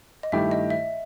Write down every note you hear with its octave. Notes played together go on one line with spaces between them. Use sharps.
D#5
G2 D#3 A3 E4 G4 E5
D#5
E5